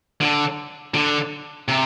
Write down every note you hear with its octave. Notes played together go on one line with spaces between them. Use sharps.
D3
D3
C3